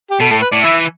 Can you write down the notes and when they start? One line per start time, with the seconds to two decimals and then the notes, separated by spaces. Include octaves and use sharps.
0.11 G4
0.20 B2 A4
0.31 A2 A4
0.42 B4
0.52 A2 D5
0.63 E3 E5